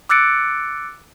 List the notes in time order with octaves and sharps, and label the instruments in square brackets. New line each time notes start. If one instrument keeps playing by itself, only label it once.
[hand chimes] D6 E6 F#6 A6 C#7 D7